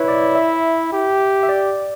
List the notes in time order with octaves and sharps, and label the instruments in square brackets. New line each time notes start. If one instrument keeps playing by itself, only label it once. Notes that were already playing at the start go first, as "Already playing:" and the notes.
Already playing: [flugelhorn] E4 [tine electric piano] B4 C#5
[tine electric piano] D5
E5
[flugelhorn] G4
[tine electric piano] E5
D5